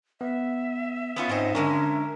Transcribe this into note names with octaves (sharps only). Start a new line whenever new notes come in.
B3 E5
B3 C#4 F4
G#2 C4 C#4 D#5
D3 G#3 C#4 D4 A#4